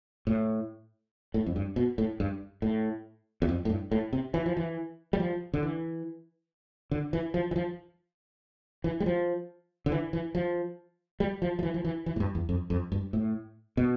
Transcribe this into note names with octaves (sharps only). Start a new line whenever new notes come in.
A2
A2
F2
G2
B2
A2
G2
A2
E2
F2
A2
G2
A2
C3
E3
F3
E3
G3
F3
D3
E3
D3
E3
F3
E3
F3
E3
G3
F3
D3
E3
E3
F3
G3
F3
F3
E3
F3
E3
E3
A2
G2
E2
F2
F2
G2
A2
B2